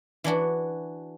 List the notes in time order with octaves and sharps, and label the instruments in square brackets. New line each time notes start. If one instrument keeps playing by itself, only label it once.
[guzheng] E3 D4 F#4